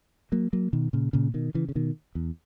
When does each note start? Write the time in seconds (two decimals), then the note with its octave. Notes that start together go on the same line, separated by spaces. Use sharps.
0.32 F#3 A#3
0.53 F#3 A#3
0.73 B2 D#3
0.93 A#2 C#3
1.13 A#2 C#3
1.34 B2 D#3
1.54 C#3 E3
1.69 C#3
1.75 B2 D#3
2.15 E2